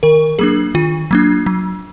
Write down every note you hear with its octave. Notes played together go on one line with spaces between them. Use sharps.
D#3 A#4
F#3 A#3 D4 G#4
D#3 F4
F#3 A#3 D4
F#3